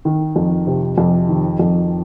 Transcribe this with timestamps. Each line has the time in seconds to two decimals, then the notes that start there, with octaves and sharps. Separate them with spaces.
0.05 D#3
0.36 F2
0.67 C3
0.98 F2
1.29 D#3
1.59 F2